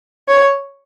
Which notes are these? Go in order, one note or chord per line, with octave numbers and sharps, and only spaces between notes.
C#5